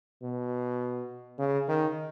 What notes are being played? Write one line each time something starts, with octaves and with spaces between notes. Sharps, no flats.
B2
C#3
D#3